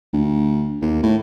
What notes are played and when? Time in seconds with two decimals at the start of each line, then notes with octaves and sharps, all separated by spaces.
0.13 D2
0.82 D#2
1.03 A2